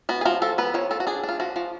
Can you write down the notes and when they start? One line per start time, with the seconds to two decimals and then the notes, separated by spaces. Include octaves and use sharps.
0.09 B3 F#4
0.21 G#4
0.25 F3 F#4
0.42 F3 A4
0.58 B3 B4
0.74 F3 C#5
0.91 F3 A4
1.00 F#4
1.07 D4 G#4
1.23 D4
1.29 F4
1.40 F3 F#4
1.56 F3